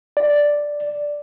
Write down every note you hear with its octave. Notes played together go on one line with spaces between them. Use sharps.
D5